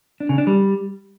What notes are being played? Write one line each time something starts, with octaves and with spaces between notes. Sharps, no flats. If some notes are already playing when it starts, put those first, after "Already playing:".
D4
C#3
D4
G3